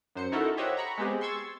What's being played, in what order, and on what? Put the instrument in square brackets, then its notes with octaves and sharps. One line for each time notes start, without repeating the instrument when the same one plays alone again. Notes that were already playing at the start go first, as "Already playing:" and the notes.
[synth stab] F#2 C5 C#7
D#4 E4 F#4 A4 A#4
G4 C5 C#5 D#5 E5 F#5
A#5 B5 C#6
G#3 B3 C4 G4 G#4
C6 C#6 E6 G#6 A6